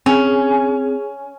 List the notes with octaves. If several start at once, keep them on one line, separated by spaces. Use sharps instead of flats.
C4 C#4 G#4